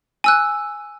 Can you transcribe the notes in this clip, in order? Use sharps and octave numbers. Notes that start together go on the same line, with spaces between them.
G#5 E6 F#6